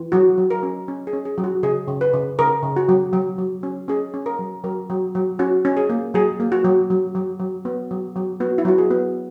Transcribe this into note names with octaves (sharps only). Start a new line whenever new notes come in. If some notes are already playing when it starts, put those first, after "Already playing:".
Already playing: E3
F#3 F#4
F#3
A#4
C#4
C#4
G#4
C#4
G#4
F#3
F#4
C#3 G#4
C#3
B4
C#3
C#3 A#4
C#3
F#4
F#3
F#3
F#3
C#4
C#4 G#4
C#4
A#4
F#3
F#3 A#4
F#3
F#3
C#4 F#4
C#4
G#4
A#3
F#3 G#4
A#3
F#4
F#3
F#3
F#3
F#3
B3
F#3
F#3
B3 F#4
E4
F#3 F#4
G#4
B3